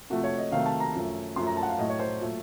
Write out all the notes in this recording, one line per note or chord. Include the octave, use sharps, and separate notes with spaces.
C3 F3 A3 F#4
C#5
D#5
C3 D#3 F#3 A3 F5
A5
A#5
F#2 F3 A3
F#2 F3 A3 C6
A#5
A5
F#5
F5
A2 F#3 A3 D#5
C#5
C5
A#2 F#3 A3